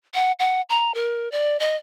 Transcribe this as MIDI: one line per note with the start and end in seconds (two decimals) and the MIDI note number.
0.14 0.32 78
0.39 0.62 78
0.69 0.94 82
0.94 1.30 70
1.32 1.59 74
1.60 1.76 75